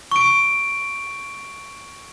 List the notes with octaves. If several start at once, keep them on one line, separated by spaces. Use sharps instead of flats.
C#6 D7